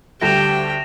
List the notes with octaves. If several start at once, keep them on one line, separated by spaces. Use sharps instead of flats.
D2 G3 A3 G4 G5 A#6 E7 F7